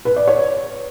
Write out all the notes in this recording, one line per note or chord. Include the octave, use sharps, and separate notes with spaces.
B4
D5
C#5